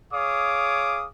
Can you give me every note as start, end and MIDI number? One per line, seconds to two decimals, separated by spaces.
0.13 1.06 68
0.13 1.06 73
0.13 1.06 77
0.13 1.06 86
0.13 1.06 87